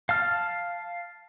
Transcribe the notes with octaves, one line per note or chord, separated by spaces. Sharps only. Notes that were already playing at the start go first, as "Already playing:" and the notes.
F5 A5 F6